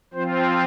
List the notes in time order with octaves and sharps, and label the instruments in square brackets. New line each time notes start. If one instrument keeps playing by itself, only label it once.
[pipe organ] F3 C4 F4 C5